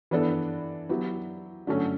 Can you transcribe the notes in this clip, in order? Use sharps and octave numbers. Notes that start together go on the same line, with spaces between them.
E3 B3 D4 A4
F#3 B3 E4 G4
D3 F#3 A3 C#4